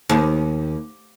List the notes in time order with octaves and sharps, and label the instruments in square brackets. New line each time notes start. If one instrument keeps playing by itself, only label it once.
[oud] D#2